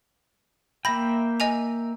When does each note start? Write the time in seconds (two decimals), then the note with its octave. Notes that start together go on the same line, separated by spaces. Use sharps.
0.85 A#3 E5 G5 B5 A#6
1.40 D#5 G#5 F7